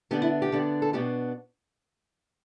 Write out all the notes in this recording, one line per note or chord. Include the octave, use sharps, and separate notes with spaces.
D3 B3 D4 G4
E4
G4
D3 B3 D4
A4
B2 B3 D4 G4